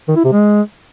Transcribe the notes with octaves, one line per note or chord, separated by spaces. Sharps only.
D#3
E4
C3
G#3